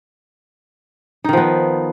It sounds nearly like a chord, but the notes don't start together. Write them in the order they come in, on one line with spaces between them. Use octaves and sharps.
D#4 D#3 F3 B3